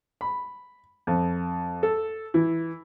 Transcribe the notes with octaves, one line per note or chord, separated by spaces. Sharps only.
B5
F2
A4
E3